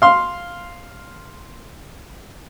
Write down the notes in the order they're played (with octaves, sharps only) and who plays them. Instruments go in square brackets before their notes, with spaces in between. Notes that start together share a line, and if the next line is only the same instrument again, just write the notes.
[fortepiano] F5 C6